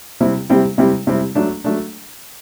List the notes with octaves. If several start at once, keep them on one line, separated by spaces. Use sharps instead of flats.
C3 G3 C4 E4
C3 G3 C4 E4
C3 G3 C4 E4
C3 G3 C4 E4
F#3 A3 D4
F#3 A3 D4